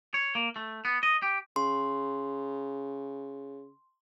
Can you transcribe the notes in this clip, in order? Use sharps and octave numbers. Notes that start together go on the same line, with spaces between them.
C#5
A#3
A3
B3
D#5
G4
C#3 C6